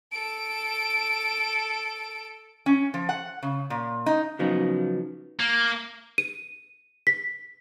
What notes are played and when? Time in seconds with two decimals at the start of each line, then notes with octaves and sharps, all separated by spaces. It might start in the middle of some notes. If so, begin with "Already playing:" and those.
0.12 A4 D7
2.66 C#4
2.94 F3
3.09 F#5
3.43 C#3
3.70 A#2
4.06 D#4
4.39 C#3 F3 F#3 B3 D#4
5.39 A#3
6.18 D#7
7.07 B6